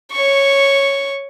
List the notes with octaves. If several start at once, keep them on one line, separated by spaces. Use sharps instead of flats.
C#5 C#6